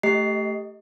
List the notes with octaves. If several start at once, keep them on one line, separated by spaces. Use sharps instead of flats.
A3 G4 D#5 C7